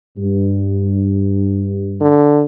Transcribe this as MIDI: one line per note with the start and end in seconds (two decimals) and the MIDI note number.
0.18 2.14 43
2.01 2.45 50